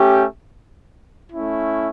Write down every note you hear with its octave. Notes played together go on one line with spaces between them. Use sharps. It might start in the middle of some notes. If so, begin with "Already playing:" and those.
Already playing: A3 C#4 G4
A3 C#4 E4